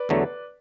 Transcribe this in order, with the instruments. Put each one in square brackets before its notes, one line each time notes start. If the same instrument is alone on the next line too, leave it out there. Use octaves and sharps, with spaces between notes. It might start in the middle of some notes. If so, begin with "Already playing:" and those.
Already playing: [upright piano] B4 D5
[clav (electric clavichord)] E2 D3 F#3 A3